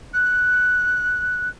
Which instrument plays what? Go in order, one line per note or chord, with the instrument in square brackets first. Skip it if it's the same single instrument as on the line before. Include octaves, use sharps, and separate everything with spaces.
[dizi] F#6